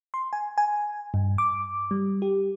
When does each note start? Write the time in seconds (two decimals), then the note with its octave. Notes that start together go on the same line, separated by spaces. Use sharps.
0.14 C6
0.33 G#5
0.58 G#5
1.14 G2
1.38 D6
1.91 G3
2.22 G4